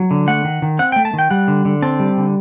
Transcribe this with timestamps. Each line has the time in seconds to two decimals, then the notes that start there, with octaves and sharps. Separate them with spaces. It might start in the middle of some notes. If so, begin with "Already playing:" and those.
Already playing: F#3
0.11 D3
0.28 A3 F#5
0.44 D#3
0.62 D#3
0.79 C4 F#5
0.92 A3 G5
1.05 A5
1.13 D#3
1.19 G5
1.30 G3 F#5
1.48 D3
1.65 D3
1.82 C4 A5
2.00 G3
2.17 D3